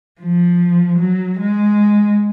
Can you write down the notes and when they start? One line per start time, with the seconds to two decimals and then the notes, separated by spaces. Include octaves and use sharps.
0.21 F3
0.99 F#3
1.40 G#3